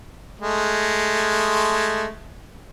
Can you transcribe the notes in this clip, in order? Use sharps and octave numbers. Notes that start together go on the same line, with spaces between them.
G#3 A3